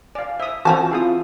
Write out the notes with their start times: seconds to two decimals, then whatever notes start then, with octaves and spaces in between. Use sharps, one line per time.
0.15 D5 F5 G#5
0.40 C5 E5 D#6
0.65 E3 F3 C4 F#4 C5 G#5 A5
0.91 C4 E4 F4 G#4 D#6